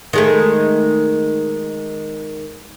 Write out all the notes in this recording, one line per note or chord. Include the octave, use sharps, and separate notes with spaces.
D#3 G#3 A3